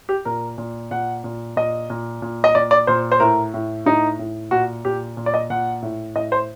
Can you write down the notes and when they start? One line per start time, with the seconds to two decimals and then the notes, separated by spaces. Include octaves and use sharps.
0.09 G4
0.25 A#2 A#4
0.58 A#2
0.91 A#2 F#5
1.24 A#2
1.56 A#2 D#5
1.90 A#2
2.22 A#2
2.44 D#5
2.55 A#2 D5
2.71 D5
2.87 A#2 C5
3.12 C5
3.20 A2 A#4
3.54 A2
3.86 A2 D#4
4.19 A2
4.51 A#2 F#4
4.85 A#2 G4
5.17 A#2
5.26 D5
5.34 D#5
5.50 A#2 F#5
5.82 A2
6.15 A2 D#5
6.32 C5